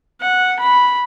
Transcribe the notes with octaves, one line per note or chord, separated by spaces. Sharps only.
F#5
B5